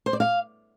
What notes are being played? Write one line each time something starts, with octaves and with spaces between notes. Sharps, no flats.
C5
D5
F5